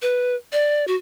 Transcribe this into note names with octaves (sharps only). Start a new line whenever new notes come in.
B4
D5
F#4